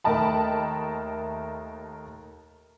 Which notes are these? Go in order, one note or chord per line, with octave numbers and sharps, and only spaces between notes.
D#2 A3 A#4 D#5 A5 B5